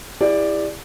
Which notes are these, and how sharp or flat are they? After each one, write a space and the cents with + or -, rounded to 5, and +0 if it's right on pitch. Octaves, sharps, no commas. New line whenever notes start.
E4 +0 G4 +45 D5 +0